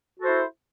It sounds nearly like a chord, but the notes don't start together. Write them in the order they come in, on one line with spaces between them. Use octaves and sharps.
F#4 A4 C5 E4